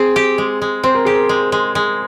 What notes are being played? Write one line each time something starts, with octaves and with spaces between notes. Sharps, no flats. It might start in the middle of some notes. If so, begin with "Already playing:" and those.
Already playing: C4 G#4
G4
G#3
G#3
C4 C5
A#4
G4 G#4
A#4
G#3
G#3
G#3